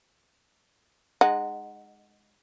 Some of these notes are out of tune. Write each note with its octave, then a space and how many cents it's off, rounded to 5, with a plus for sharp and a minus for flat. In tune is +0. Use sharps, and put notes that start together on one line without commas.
G#3 +0 D#4 -20 F#5 +0